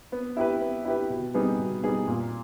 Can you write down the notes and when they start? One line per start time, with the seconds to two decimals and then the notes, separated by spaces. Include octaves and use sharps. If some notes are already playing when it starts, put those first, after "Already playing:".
0.12 B3
0.37 E4 G4 B4
0.61 B3
0.85 E4 G4 B4
1.10 B2
1.34 G3 B3 D#4 G#4
1.59 B2
1.84 G3 B3 D#4 G#4
2.08 A#2